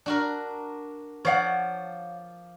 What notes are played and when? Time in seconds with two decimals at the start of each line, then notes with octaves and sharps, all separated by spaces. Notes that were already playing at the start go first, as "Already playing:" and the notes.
0.06 D4 F#4 A#4
1.25 F3 C#5 D5 F5 F#5